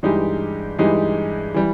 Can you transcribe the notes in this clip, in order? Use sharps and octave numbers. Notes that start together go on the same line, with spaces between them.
G2 E3 G#3 D#4 G4
G2 E3 G#3 D#4 G4
E3 G3